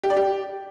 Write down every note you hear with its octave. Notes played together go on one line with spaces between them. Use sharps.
G4
D5
G4